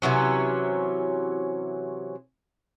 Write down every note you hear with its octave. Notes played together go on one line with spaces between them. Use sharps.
C3 E3 F#3 C#4